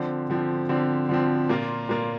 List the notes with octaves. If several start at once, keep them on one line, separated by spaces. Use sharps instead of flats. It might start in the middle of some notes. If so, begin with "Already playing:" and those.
Already playing: D3 F3 C4
D3 F3 C4
D3 F3 C4
D3 F3 C4
A#2 A#3 F4
A#2 A#3 F4